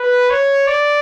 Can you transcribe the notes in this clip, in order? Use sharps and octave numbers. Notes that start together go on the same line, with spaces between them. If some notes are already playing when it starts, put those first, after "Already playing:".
Already playing: B4
C#5
D5